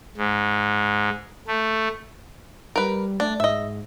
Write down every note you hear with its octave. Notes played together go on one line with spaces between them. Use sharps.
G#2
A3
G3 A#4 B4
A3 D4
G#2 D#5 E5